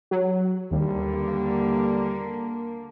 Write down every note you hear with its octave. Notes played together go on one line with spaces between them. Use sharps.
F#3
D#2 D3 G3 A#3